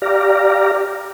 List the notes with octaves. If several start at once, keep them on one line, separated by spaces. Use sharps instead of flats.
G4 D5 F5 A#5